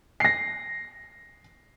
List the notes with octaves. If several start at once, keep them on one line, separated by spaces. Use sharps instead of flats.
A#6 C7